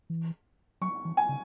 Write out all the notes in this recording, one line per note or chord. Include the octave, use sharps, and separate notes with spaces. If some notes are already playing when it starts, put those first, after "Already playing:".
E3
F#3 C#6
E3
G#5
C#3